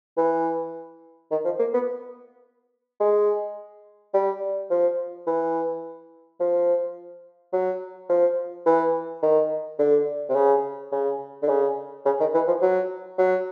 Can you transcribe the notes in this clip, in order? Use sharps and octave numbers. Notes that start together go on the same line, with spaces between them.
E3
D#3
F3
A#3
B3
G#3
G3
F3
E3
F3
F#3
F3
E3
D#3
D3
C3
C#3
C#3
D3
C#3
C#3
D#3
E3
F3
F#3
F#3